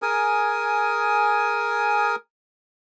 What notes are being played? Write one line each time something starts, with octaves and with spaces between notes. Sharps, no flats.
G#4 A#4 G#5 D#6